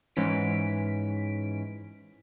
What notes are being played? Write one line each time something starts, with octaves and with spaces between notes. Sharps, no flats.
G#2 E3 C#4 B6 D7